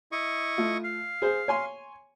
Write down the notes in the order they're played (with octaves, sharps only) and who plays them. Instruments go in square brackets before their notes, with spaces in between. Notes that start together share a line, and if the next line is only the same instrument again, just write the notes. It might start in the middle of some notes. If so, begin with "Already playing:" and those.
[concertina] E4 D#5 C#6
[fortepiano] A3 F4
[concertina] F5
[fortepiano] G#4 C5
C#5 G#5 C6